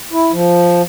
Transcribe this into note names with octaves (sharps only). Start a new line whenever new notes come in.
E4
F3